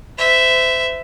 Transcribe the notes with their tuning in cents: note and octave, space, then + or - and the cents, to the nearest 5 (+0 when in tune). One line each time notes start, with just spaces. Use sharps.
C5 -35 E5 +0